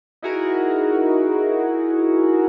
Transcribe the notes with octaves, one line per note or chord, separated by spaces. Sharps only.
D#4 E4 F#4 G#4 A#4